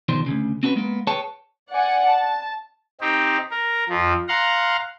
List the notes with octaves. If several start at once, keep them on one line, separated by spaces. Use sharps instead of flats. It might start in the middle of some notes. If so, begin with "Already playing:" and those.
B2 D#3 F3 G3 C5
D2 A#2 C#3
C4 C#4 F#4 A4 B4
G#3 A#3 B3
G#4 B4 C#5 G5 A5
D5 F#5 G#5
A5
C4 D#4 G4
A#4
F2 F3
F5 F#5 A#5 C6